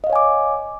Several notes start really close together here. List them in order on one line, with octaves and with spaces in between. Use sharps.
D#5 F5 C#5 G#5 D6